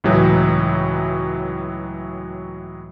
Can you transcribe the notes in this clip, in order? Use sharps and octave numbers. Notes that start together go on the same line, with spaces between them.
C#2 A2 E3 F#3